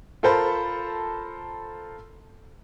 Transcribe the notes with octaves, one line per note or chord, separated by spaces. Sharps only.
F4 A4 A#4 C5 A5 B5